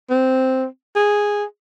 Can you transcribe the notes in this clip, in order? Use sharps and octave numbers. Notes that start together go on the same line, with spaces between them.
C4
G#4